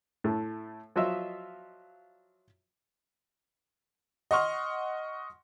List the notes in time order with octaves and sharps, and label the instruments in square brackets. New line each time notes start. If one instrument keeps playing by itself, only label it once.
[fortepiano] A2 A3
F3 F#3 F4 D#5 E5 E6
[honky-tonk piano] D#5 F#5 C6 C#6 F6